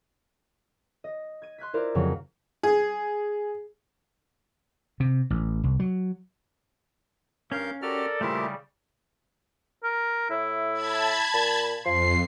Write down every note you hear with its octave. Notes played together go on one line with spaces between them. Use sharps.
D#5
G#6 D#7
C6 F#6 G#6 B6
E4 F4 A#4 C5 D5
F2 C#3 F#3 G#3
G#4
C3
A1
C2
F#3
G2 C#4 A#4 F5 G6
F#4 G4 A4 A#4 D5 F6
A#2 C#3 G3 A3 E4 G4 A#4 C5
A#4
A2 E4
A5 B5 G#6
A#2
F2 F3 C6 C7